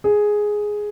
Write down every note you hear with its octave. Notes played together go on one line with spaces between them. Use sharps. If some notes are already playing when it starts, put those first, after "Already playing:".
G#4